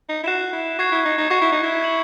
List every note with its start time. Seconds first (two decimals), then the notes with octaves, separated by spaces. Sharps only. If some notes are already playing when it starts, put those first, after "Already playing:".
0.09 D#4
0.23 E4
0.26 F#4 F#6 C7 E7
0.53 E4
0.79 F#4 C#6 G#6 C7
0.92 E4
1.05 D#4
1.18 D#4
1.30 F#4 C#6 G#6 C7
1.41 E4
1.52 D#4
1.63 E4
1.82 G#6 C#7 F#7